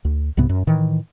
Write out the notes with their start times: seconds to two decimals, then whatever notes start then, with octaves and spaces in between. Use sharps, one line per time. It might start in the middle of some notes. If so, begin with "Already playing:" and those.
0.05 D2
0.37 C2 G#2 C3 B3
0.49 F#2
0.67 A2 D#3 E3